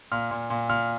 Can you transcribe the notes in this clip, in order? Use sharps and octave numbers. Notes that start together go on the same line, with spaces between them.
A#2 F6
A#2
A#2
A#2 F6